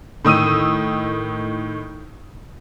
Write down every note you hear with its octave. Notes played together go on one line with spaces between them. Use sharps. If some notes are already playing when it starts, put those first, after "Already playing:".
A2 D#3 D#6 E6 D#7